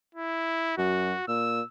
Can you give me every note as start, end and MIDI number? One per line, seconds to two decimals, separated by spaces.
0.15 0.78 64
0.78 1.14 42
0.78 1.28 66
1.28 1.61 46
1.28 1.66 88